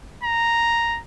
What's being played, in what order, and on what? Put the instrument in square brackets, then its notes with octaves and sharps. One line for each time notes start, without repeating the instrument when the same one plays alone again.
[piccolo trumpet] A#5